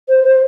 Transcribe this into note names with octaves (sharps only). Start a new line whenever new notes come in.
C5
C5